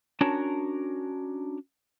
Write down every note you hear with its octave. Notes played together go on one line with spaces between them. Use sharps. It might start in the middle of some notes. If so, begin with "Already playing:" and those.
C#4 D4 F#4 A#4 C#5 A5